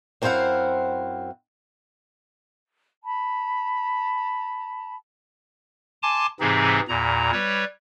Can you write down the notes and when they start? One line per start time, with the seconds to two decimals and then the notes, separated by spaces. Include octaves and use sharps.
0.22 F#2 C4 E4 C5 F5 F#5
3.04 A5 B5
6.03 G#5 A5 C6 D6
6.40 G#2 C3 E3 C4 D#4 G#4
6.89 E2 A#2 A#5
7.32 G3 B4 C#5